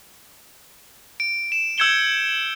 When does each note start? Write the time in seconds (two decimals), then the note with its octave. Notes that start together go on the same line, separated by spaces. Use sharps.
1.20 D7
1.52 E7
1.78 E6 G6 G#6 C#7 E7 G7